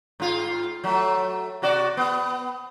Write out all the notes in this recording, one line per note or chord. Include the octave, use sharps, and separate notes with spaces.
G#2 F4
F#3 A3
C3 F#4 D5
B3